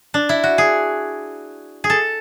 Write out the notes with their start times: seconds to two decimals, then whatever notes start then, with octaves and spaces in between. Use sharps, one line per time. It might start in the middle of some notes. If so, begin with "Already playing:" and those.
0.14 D4
0.29 E4
0.44 F#4
0.58 G#4
1.84 G#4
1.90 A4